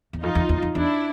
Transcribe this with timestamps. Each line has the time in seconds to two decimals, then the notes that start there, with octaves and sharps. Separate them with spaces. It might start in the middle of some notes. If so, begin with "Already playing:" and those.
0.13 E2
0.22 F2 D#4 F4
0.35 E2
0.49 E2
0.62 F2
0.75 E2 D4 E4